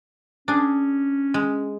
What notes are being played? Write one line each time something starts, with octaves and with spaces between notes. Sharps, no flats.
C#4 D4 G#4
G#3